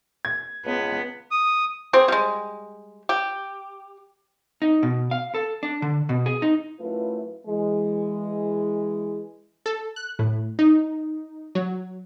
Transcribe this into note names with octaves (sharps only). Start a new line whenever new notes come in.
G#6
C#2 B3
D#6
C4 G4 G#4
G3 G#3
G4
D#4
B2
F5
A4
D4
D3
B2
G#4
D#4
F#2 A3 E4 F4 B4
E3 G#3
A4
F#6
A2
D#4
F#3